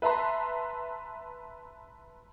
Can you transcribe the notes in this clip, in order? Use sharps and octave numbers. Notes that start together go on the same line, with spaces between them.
B4 E5 A5 A#5 C6